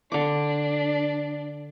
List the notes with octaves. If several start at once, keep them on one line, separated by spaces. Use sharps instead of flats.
D3 D4 D6